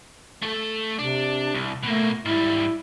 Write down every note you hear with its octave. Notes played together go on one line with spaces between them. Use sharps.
A3 A4
C3 D4
C2
B2 A3 A#3
G#2 G3 E4